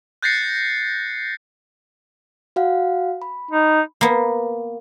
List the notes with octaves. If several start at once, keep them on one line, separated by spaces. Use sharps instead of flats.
F#6 G6 A6 A#6 C7 C#7
F#4 F5 F#5
B5
D#4
A#3 B3